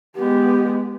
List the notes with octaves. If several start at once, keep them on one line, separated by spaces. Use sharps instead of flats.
G#3 B3 G4